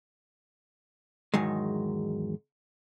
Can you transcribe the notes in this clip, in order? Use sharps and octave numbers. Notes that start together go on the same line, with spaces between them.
E2 G#2 D#3 F#3 G#3